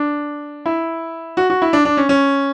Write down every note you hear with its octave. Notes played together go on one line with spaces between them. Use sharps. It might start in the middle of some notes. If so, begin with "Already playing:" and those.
Already playing: D4
E4
F#4
F#4
E4
D4
D4
C#4
C#4